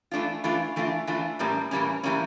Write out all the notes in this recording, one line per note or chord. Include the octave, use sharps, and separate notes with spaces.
E3 A3 D4 F4
E3 A3 D4 F4
E3 A3 D4 F4
E3 A3 D4 F4
A2 E3 G3 A#3 C#4
A2 E3 G3 A#3 C#4
A2 E3 G3 A#3 C#4